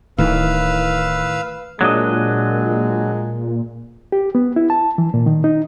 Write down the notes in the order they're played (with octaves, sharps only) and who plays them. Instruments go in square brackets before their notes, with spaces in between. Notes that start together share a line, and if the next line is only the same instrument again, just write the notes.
[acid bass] D1 [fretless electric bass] A2 D#3 E3 [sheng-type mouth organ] B4 F5 E6
[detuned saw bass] A#2 [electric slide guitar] F#3 D4 D#5 [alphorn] G#3
[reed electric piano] G4
B3
E4
A5
E3
A#2
D#3
D#4